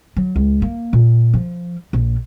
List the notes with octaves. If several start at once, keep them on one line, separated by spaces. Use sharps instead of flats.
F#3
C#2
A#3
A#2
F3
A#1